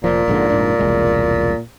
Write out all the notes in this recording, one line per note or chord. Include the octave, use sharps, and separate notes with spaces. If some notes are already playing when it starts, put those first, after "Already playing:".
F1 A#2 F3
A#1 G#2 D3
F1 G#2 D4
E1 C2 G#3